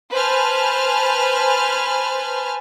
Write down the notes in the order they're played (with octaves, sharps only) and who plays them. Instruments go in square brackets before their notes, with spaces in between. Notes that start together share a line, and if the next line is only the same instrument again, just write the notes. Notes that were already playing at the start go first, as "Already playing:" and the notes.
[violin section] B4 C5 G#5 A5 F6